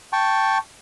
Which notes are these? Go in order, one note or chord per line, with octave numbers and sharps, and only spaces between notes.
G5 A5 C#6